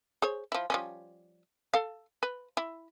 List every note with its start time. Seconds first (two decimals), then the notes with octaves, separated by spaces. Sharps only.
0.22 G#4 C5 C#5
0.52 F3 E4
0.70 F3 G3 C#4
1.74 A4 F5
2.23 B4
2.57 E4